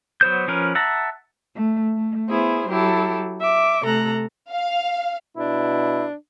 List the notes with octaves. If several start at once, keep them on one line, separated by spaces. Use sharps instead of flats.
F#3 B3 C5 G6
F3 C#4 A#4 B4
E5 F#5 A5 A#5
A3
A3
B3 E4 G#4 C5
F#3 E4 G4 A4
E5 D6
C3 A3 A4 A#5 F#6
F5
B2 D4 E4